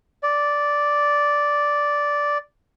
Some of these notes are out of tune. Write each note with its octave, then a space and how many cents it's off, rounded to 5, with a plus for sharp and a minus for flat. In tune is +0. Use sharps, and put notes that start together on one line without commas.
D5 -5